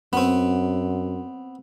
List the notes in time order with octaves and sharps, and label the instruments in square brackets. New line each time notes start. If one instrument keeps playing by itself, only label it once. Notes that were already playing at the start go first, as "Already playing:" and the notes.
[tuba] F#2 [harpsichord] B3 C4